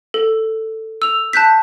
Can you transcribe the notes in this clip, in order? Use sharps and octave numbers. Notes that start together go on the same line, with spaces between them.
A4
E6 F7
A5 F#6 G6 B6